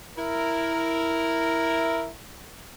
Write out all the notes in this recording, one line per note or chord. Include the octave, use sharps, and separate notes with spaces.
E4 A#4